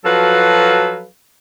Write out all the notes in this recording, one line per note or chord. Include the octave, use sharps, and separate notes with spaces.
F3 F#3 F#4 A4 B4 F5